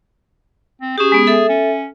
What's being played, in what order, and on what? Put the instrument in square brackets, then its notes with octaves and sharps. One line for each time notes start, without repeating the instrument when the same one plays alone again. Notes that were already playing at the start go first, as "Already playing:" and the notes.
[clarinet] C4
[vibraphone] C#4 G4 [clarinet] G#4
[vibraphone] G#3 B3
A4 E5
[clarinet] C#4